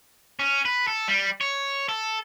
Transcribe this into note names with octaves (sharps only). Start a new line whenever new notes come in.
C#4
B4
A4
G3
C#5
A4